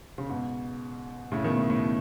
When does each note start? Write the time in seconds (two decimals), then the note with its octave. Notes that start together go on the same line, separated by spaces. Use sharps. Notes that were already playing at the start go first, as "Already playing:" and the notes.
0.18 C#3
0.29 G#2 B2
1.32 A2 C#3
1.44 B2 D#3
1.57 A2
1.70 A2
1.79 B2